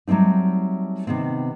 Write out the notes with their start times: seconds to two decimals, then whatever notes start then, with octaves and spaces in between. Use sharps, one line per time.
0.07 F#3 G3 A3 C4 D#4
1.07 C3 D#3 B3 C4